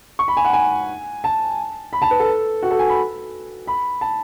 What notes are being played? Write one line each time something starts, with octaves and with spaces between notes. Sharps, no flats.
C#6
B5
G#5
F#5
G#5
A5
B5
A5
B4
A4
F#4
A4
G#5
B5
B5
A5